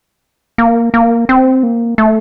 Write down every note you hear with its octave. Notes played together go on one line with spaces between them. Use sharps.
A#3
A#3
C4
A#3
A3